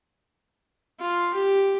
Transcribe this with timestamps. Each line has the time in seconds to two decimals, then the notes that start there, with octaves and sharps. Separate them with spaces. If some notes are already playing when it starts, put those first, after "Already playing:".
1.00 F4
1.33 G4